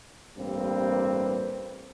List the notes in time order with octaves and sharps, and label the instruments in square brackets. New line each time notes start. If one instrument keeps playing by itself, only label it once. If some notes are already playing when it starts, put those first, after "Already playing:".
[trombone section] A1 G2 G3 A#3 C4 B4